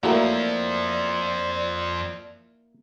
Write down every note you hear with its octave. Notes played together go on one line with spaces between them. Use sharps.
F2 F3 F#3 A3 A#3 E4 A#4 D5